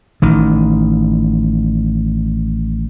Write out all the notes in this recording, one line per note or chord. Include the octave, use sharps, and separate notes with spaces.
A1 D#3